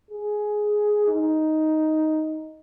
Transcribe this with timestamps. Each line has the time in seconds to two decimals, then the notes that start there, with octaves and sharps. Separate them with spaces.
0.11 G#4
1.08 D#4